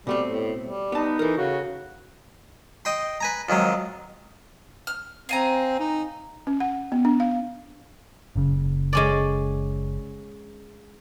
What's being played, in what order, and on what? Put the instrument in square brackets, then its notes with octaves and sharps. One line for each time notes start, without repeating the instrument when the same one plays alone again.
[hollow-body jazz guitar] B2 A3 C4 [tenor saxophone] G3
[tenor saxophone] A2
G3
[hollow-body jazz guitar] B3 A5 [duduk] D#4
[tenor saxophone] E3 [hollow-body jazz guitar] A4 A#4
[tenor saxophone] C#3 [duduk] F#4
[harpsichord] D#5 G5 C6
B4 G#5 A#5
F2 D#3 F#3 G#3
[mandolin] F6
[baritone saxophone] C4 [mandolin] F5 G#5 A#5
[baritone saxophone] D#4
[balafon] C#4
F#5
B3
D4
F5
[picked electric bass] F#1 C#3
[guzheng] G#3 C#4 D5